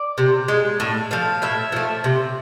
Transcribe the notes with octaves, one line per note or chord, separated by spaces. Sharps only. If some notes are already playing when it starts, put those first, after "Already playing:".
Already playing: D5
C3
G#3
A2
F3 A3 F5
A2 E5
F3 A3
C3